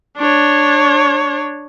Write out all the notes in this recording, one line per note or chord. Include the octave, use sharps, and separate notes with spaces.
D4 C#5